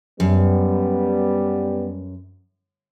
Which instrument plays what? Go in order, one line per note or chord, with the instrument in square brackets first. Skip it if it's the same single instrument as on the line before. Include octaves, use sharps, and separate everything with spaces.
[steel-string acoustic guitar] F#2 [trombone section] G3 B3